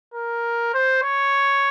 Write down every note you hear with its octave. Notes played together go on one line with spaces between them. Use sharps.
A#4
C5
C#5